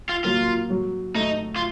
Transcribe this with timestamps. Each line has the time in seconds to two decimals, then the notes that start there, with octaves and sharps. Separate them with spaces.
0.09 F4
0.24 F#3 A#3 F4
0.70 F#3
1.15 A3 D#4
1.56 F4